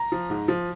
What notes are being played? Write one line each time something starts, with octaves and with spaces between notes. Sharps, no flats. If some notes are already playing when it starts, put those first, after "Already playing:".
Already playing: A#5
F3
G#2
F3